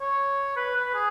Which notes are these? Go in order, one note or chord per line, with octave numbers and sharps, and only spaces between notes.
C#5
B4
B4
G#4